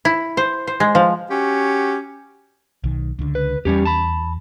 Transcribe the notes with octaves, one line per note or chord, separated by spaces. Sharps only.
E4
C5
C5
G#3
F3
C#4 F#4 G4
B1 D#3
C#2 D3
B4
E2 G3 C#4 G4
A5 B5